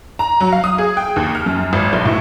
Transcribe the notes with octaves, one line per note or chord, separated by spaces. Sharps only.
A#5
F#3
F5
D#6
G#4
G5
D#2
F6
F#2
G#1
B1
A2